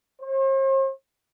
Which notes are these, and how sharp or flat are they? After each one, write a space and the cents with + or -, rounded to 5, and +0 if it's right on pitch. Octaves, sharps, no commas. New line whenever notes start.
C5 +45